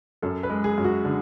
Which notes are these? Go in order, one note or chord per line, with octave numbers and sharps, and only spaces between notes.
F#2 A4
B4
G#3
G#4
F#2
F#4
D3